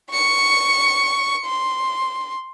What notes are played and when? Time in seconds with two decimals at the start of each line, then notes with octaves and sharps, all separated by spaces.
0.11 C#6 C#7
1.45 C6